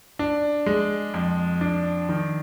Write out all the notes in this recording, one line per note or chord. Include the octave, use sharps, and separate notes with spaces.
D4
G#3
F2
D4
D#3